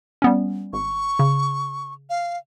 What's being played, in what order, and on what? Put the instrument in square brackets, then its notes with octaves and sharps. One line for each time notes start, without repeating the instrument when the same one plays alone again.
[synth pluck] G3 B3 C#4
[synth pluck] G#1 [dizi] C#6
[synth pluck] C#3
[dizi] F5